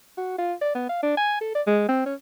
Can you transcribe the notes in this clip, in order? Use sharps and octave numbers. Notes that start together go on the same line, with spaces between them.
F#4
F4
D5
B3
F5
D4
G#5
A4
D5
G#3
C4
C#4